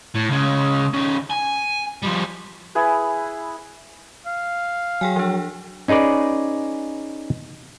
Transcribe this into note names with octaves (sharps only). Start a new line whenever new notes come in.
A2
C#2 C#3
D#3 C#4
G#5
F3 G3
E4 G#4 B4
F5
F#3 G#4 G5 G#5
F3 D4
C#4 D#4 G#4 B4 D5